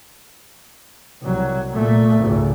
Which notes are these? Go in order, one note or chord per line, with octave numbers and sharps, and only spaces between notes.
C2 F#3
A#2 A3
G#1 C#2